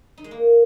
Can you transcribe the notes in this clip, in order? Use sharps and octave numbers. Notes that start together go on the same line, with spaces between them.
D#4
G#3
A#3